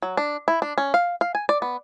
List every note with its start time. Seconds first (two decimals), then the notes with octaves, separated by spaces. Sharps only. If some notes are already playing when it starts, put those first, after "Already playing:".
0.02 F#3
0.17 D4
0.48 E4
0.62 D4
0.78 C#4
0.94 F5
1.21 F5
1.35 G#5
1.49 D5
1.62 B3